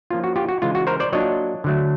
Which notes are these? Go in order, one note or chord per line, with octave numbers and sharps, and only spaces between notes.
F3 A#3 C#4 F4
F#4
F4 G4
F#4
C#3 E3 G#3 F4
F#4
A#4 C5
C5 D5
F#3 A#3 D4 F4 C#5 D#5
D3 F#3 A3